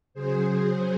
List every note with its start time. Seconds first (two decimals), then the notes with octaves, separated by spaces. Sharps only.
0.14 C#3 F#3 G#4 C5
0.46 G#4 C5